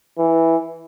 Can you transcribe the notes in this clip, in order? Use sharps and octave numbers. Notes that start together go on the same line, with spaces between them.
E3